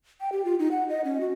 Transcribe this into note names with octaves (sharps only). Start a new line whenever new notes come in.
G5
G4
F4
D#4
F#5
D#5
C#4
F#4